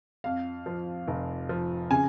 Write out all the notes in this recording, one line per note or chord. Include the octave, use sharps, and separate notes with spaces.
F2 F5
F3
F1
F3
C#3 G#5